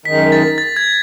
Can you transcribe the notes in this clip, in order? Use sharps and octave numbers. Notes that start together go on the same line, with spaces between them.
F#2 D#3 G#3 D#4 B6
A6
A6
G#6